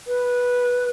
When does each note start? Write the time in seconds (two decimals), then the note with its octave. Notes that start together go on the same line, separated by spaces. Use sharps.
0.08 B4